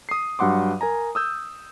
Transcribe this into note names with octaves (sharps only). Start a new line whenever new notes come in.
D#6 C7
G2 F#3 F#5 C6 D6
A#4 G#5 A#5
D#6 E6 G6